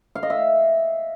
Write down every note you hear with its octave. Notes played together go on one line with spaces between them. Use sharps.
F5
D#5
E5